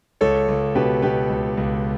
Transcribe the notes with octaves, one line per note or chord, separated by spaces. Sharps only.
C#2 A4 C#5
C#2
B2 G4 B4
B2 G4 B4
C#2
C#2